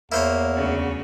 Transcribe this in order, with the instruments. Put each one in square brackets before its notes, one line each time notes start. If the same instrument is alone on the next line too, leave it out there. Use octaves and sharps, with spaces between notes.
[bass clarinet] E2 [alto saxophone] A#3 [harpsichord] E4 C5 C#5
[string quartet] D2 C#3 F#4